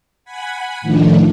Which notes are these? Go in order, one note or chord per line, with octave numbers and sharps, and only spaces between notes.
F#5 G#5 B5
A2 D#3 F3 A3 D4